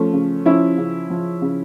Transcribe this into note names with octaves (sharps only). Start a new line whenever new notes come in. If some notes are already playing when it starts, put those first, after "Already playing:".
Already playing: F3 A3 C#4
C#3
F3 C#4 E4
C#3
F3
C#3